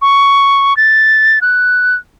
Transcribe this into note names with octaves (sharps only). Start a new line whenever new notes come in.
C#6
A6
F#6